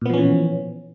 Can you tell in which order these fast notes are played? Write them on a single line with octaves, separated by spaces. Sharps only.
A#2 B3 F3 C#4 E3